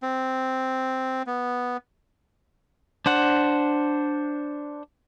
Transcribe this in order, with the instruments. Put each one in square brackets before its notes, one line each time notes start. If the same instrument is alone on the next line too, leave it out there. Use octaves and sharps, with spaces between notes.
[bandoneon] C4
B3
[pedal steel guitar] D4 C5 F#5